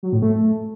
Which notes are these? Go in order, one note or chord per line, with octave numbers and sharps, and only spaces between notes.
F#3
A2
A3